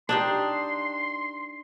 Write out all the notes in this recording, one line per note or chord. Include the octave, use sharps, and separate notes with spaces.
D4 D#4 G4 C6